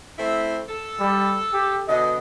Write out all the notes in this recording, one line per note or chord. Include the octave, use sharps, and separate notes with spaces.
A3 C4 E4
A4
G3
G4
B2 D3 D#5